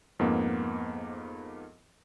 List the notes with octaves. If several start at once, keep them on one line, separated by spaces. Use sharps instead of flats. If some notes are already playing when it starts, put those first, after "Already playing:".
F2 G#2 A#3 B3